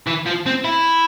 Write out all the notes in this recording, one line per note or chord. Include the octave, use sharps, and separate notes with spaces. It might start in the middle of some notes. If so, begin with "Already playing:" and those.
E3
F3
C4
E4